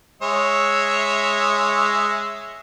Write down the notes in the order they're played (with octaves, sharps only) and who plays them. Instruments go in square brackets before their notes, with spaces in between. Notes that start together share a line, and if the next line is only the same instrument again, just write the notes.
[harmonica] G#3 C#5 E5